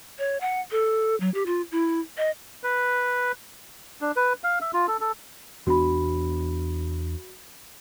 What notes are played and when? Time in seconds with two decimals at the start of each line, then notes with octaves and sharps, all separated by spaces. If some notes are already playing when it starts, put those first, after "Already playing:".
0.19 C#5
0.41 F#5
0.71 A4
1.20 F#3
1.34 G4
1.46 F4
1.72 E4
2.18 D#5
2.64 B4
4.01 D4
4.16 B4
4.44 F5
4.61 E5
4.73 F4
4.88 A4
5.01 A4
5.67 E2 B3 D4 F#4 B5